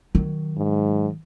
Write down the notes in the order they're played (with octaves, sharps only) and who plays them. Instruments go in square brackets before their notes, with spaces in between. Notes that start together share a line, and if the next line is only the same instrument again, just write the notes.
[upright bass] D#3 F#3
[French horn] G#2